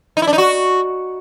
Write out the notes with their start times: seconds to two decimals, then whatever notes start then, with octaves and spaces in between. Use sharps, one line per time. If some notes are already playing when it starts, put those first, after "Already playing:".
0.17 D#4
0.22 E4
0.27 D4
0.33 D#4
0.38 F#4